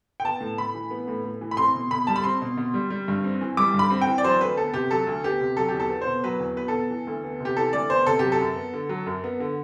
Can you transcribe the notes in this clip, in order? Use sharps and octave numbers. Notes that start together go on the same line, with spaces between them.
G5
B3 A5
A2
A2 B5
E3
B3
A2
A2
E3
B5
C4 C6
B2
B2 B5
G3 A5
B5
C4 C6
B2
B2
G3
G3
G2
C4
E3
G3 D6
G2
B5
C4
G5
E3
D5
F#3 C5
D2 B4
B3 A4
C3 G4
F#3 A4
D2
B3 G4
C3
F#3 A4
G4
E2
A4
B3
C5
B2
F#3 B4
E2
B3 B4
B2 A4
E3
D2
B3
C3 G4
E3 A4
D2 D5
B3 C5
C3 A4
F#3 G4
A4
F#2
B3
D3
F#3
F#2
B3
D3